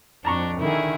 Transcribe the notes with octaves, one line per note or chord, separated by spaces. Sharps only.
F2 D4 A5 A#5 C#6
D3 D#3 E4 G#4